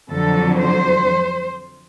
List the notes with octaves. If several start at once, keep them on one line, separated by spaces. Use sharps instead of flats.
F2 D3 F#3 A4
C5